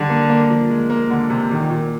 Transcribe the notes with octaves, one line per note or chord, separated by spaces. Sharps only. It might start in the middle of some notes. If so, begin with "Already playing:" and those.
Already playing: D3 G3
A#3
A#3
F3
G#3
A#3
D3
C3
A#2 D#3
A#2